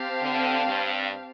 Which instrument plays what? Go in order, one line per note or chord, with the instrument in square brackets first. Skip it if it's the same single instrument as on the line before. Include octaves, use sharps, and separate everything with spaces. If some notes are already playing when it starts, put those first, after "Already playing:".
Already playing: [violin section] C4 G4 F5 A5
[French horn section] D3
G2